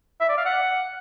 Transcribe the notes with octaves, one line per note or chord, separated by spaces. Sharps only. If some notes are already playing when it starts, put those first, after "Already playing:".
E5
D5
F5
F#5